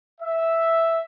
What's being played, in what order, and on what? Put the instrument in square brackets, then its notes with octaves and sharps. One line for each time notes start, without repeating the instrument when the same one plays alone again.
[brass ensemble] E5